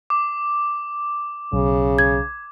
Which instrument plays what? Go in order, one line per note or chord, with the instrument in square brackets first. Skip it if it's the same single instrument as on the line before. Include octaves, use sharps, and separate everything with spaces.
[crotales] D6
[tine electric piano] B1 [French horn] C#3
[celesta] G#6